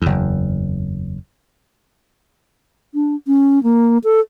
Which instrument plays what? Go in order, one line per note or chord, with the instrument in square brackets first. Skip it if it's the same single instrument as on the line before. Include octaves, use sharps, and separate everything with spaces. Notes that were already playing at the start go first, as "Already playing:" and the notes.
[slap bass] F#1 E2
[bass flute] D4
C#4
A#3
A4